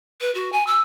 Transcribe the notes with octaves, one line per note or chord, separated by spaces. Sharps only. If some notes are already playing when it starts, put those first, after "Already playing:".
B4
F#4
G#5
E6